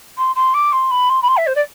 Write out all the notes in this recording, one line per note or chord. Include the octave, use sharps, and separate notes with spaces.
C6
C6
D6
C6
B5
C6
B5
C6
E5
C5
D5